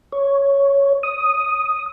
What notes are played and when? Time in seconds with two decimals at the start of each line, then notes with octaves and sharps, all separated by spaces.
0.13 C#5
1.03 D#6